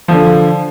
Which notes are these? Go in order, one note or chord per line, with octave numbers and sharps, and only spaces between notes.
D3 F3